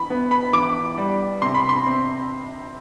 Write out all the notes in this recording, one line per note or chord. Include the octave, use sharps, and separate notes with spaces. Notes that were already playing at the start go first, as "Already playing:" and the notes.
Already playing: E3 B5
B3
B5
E3 D6
G3
C3 C6
B5
C6
C4